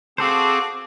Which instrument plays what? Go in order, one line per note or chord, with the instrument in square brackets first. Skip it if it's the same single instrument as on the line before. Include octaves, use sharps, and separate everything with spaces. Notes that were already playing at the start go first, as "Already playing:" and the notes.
[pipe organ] C4 G#4 [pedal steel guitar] F#4 A4 C5 [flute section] F5 A5 D6